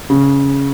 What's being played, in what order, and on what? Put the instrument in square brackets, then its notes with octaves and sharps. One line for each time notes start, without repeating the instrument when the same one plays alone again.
[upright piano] C#3